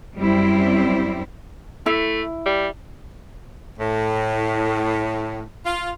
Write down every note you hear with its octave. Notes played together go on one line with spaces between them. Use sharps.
F#2 G3 C4 E4
A3 E4
G3
A2
F4